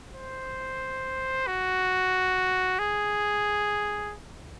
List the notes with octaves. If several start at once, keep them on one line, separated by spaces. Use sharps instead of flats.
C5
F#4
G#4